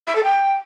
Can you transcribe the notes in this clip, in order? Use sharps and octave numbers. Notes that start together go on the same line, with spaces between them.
E5
A4
G5